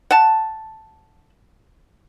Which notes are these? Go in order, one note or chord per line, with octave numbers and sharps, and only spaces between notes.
F#5 A5